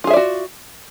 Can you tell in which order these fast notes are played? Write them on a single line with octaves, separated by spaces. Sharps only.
F4 G#4 E5 D5 F#4